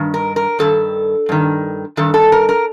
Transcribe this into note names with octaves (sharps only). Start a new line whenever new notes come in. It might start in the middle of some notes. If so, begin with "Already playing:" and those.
Already playing: G2 D#3
A#4
A#4
G2 D#3 A4
G2 D#3
G2 D#3 A4
A4
A#4
A#4